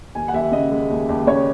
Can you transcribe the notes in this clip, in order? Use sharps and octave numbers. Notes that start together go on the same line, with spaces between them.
D#2 G#5
F#5
D#2 E5
C#3 D#5
G#3
D#2
D#2
C#3 C#5